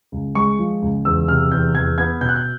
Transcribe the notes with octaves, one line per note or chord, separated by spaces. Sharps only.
C#2
G#3 C#6
F3
C#2
E2 E6
C3 F6
E2 G6
E2 G#6
B3 G#6
B2 G6
F#6
G6